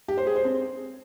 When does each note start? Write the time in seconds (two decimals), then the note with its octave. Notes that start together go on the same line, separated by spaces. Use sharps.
0.08 G4
0.18 C5
0.27 G#4
0.36 C5
0.45 C4